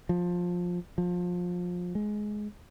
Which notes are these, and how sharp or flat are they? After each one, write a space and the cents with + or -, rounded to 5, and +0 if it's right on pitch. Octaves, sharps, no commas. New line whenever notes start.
F3 +15
F3 +25
G#3 +15